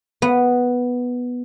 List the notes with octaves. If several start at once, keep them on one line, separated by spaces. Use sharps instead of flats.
B3